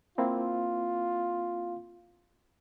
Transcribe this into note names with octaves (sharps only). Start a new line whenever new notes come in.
A#3 C4 E4 F4